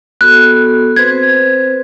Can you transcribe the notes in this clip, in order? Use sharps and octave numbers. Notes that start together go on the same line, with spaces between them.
B3 F#4 A4 F#6
C4 B4 C5 G#6